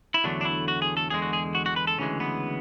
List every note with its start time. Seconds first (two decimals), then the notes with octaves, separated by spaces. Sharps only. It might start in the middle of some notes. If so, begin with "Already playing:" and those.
0.14 E4
0.24 E2 D3 F#3 A3 D4
0.41 D4
0.45 E4
0.68 F#4
0.82 G#4
0.97 A4
1.10 E2 D3 G#3 G#4
1.22 F#4
1.33 G#4
1.55 F#4
1.66 F#4
1.76 B4
1.87 A4
1.98 D2 C#3 E3 G#3 C#4
2.20 B3